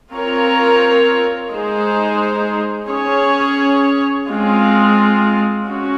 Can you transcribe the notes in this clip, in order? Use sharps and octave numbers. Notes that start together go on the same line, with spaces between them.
C4 F4 A#4 C#5
G#3 D#4 G#4 C5
C#4 G#4 C#5
G#3 C4 F4
C#4 F#4